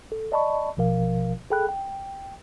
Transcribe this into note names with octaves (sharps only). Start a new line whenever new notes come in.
A4
D5 D#5 A5 B5 C#6
A1 B2 F3 A#4 F5
G#4 A4 G5 B5 F#6
G5